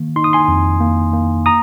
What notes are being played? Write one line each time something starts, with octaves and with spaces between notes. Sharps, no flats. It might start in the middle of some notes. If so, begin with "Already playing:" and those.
Already playing: D#3 A#3
D#4 C6
D#6
G#5 C6
F2
A#3
A#3
A#5 D#6